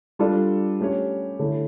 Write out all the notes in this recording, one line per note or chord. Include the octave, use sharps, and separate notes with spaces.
G3 D4 F4 A4 D5
A3 C#4 G4 C#5
D3 A3 E4 A4 C#5